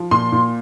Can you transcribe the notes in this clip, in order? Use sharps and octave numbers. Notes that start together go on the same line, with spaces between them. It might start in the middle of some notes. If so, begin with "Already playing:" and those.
Already playing: F3
A#2 C6
A#2